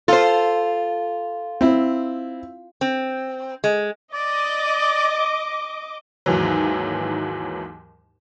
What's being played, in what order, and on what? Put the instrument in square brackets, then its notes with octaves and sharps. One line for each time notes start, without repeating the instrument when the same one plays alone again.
[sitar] F4 [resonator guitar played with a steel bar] A4 C5
[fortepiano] C4 E4
[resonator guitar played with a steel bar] C4
G#3
[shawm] D5 [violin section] D#5 D6
[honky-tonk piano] D#2 G#2 E3 F#3